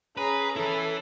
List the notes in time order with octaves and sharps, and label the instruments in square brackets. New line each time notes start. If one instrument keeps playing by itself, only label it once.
[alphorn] C#4 [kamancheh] G#4 A#5 [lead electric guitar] B4
[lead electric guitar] E4 B4 [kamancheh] A4